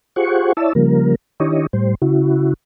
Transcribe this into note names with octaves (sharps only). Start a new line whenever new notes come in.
F4 G4 G#4 C5 F#5 C#6
E4 C#5 D5 E5 A5 E6
C#3 F3 G3 A#3 A#4
D#3 D4 E4 G4 C#5 D#5
A2 G3 C5
C#3 E4 F#4